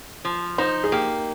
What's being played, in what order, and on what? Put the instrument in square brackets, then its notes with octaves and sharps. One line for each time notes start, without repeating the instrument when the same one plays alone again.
[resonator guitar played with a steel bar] F3
[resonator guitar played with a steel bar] D#4 [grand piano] C5
[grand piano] G#4
[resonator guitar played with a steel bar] A#3 [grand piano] G4